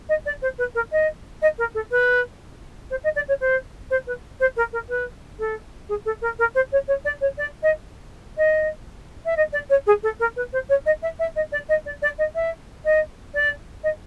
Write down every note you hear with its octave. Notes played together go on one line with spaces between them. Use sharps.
D#5
D5
C5
B4
A#4
D#5
D#5
A#4
A4
B4
C5
D#5
D5
C#5
C5
C5
B4
C5
A#4
A#4
B4
A4
G#4
A4
A#4
A#4
C5
C#5
C#5
D5
C#5
D5
D#5
D#5
E5
D#5
D5
C#5
G#4
A4
A#4
B4
C5
C#5
D#5
E5
E5
D#5
D5
D#5
D5
D5
D#5
E5
D#5
D5
D#5